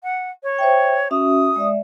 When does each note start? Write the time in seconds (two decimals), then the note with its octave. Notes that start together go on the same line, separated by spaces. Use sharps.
0.03 F#5
0.43 C#5
0.59 C5 E5 G5
1.11 C#4 F#4 E5 D#6
1.56 G#3 D5 E5